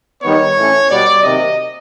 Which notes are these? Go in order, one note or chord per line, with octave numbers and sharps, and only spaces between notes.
D#3 G3 B3 D#4 C#5
A2 E3 A3 C#4
B2 G3 B3 D5
C3 D#3 F#3 A#3 D#5